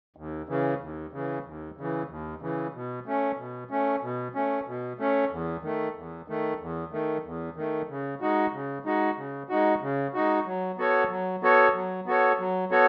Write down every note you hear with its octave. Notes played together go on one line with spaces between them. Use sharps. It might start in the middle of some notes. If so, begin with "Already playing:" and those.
D#2
C#3 E3
D#2
C#3 E3
D#2
C#3 E3
D#2
C#3 E3
B2
A3 C#4
B2
A3 C#4
B2
A3 C#4
B2
A3 C#4
E2
D#3 A3
E2
D#3 A3
E2
D#3 A3
E2
D#3 A3
C#3
G#3 D#4 F#4
C#3
G#3 D#4 F#4
C#3
G#3 D#4 F#4
C#3
G#3 D#4 F#4
F#3
B3 F#4 A4 C#5
F#3
B3 F#4 A4 C#5
F#3
B3 F#4 A4 C#5
F#3
B3 F#4 A4 C#5